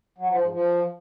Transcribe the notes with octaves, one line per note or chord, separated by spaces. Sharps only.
F#3
F3
G#2
F3